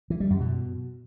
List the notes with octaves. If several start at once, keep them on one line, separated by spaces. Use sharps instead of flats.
E3
G3
F#2
B2